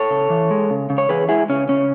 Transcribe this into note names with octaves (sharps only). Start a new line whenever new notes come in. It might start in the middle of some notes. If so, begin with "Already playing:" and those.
Already playing: A4 C#5
C#3
E3
G#3
C#3
C#3
C#5
E3 G#4 B4
G#3 E4 G#4
C#3 C#4
C#3 C#4